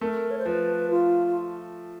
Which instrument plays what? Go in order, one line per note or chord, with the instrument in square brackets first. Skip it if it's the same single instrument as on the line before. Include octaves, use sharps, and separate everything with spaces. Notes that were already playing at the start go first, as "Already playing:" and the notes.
[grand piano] A3 [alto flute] A#4
[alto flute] C#5
C5
[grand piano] F3 [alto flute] B4
[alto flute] F4